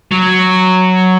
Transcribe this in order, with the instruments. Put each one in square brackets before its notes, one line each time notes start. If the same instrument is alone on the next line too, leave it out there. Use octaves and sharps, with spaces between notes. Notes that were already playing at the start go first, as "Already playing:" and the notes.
[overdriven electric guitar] F#3